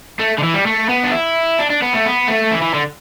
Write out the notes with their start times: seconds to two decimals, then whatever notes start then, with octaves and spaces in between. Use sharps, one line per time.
0.19 A3
0.38 D3
0.43 E3
0.54 G3
0.66 A3
0.89 B3
1.03 D4
1.12 E4
1.59 D4
1.70 D4
1.82 B3
1.93 A3
2.05 B3
2.28 A3
2.51 E3
2.62 E3
2.74 D3